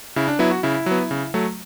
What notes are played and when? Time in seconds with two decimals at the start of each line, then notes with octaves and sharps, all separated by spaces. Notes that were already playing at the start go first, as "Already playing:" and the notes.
0.16 C#3 E4
0.28 D4
0.39 F#3 B3 E4
0.51 F#4
0.63 C#3 E4
0.86 F#3 B3
1.11 C#3
1.34 F#3 A3